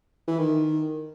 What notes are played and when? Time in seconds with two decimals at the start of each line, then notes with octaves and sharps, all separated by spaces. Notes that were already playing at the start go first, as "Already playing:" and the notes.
0.28 E3
0.39 D#3